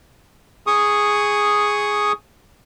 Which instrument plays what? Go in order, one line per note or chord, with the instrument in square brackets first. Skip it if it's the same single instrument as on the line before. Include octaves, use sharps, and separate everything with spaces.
[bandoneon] G#4 C#6 D#6